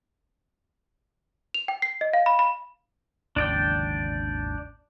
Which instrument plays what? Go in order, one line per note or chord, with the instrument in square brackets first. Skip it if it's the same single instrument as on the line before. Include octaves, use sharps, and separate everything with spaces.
[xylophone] F7
G5
C7
D#5
F5
B5
B5
[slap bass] G#1 D#2 C#3 [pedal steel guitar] D4 D5 G5